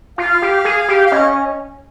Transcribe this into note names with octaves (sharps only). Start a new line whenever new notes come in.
F4 F5
G4
G#4
G4
F5
C#4 D#5